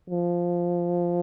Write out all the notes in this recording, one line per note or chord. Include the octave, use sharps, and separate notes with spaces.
F3